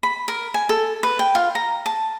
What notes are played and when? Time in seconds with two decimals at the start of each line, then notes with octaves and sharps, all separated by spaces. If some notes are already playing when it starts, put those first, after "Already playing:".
0.03 B5
0.28 A#4
0.54 G#5
0.69 A4
1.03 B4
1.19 G5
1.35 F4
1.55 A#5
1.86 A5